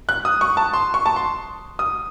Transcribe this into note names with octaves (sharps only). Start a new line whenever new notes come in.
F#6
D#6
C#6
A5
C6
C#6
A5
C6
D#6